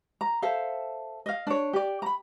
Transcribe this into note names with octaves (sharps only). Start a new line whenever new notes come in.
A#5
A4 C5 E5 F5
D#5 F5
D4 C#5
G4 D5
A#5 B5